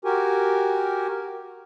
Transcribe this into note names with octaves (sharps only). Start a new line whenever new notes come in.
F#4 G4 A#4 G#5